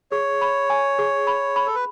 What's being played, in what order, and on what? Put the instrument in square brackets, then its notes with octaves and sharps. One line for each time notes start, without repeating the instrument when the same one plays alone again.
[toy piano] G#4 [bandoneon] C#5
[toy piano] B5
G#5
G#4
B5
B5
[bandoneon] A4
B4